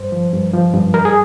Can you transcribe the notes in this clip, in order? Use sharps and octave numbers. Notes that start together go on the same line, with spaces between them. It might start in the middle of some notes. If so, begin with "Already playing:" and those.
Already playing: G2 C5
F3
G2
F3
G2
G3 A#4
G#4